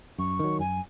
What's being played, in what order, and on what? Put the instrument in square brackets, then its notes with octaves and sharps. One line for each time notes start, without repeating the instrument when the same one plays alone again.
[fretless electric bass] F#2 [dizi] C#6
[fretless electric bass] D#3 F#3
[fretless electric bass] F#2 [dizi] G#5